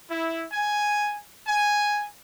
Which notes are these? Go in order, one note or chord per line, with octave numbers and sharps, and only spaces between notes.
E4
G#5
G#5